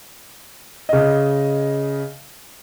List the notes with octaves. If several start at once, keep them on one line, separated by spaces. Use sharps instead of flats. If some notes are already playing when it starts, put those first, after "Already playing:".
C#3 D#5